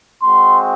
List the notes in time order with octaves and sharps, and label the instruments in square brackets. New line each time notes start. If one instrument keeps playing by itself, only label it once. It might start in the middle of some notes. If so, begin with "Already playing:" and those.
[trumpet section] G#3 C4 F#4 C6